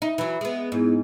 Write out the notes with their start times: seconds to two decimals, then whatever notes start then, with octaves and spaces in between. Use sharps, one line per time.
0.02 D#4 E5
0.18 E3 F#3
0.41 G#3 B3
0.72 G#2 B3 E4 G#4